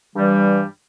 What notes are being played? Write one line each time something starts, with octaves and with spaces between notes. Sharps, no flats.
G2 E3 G3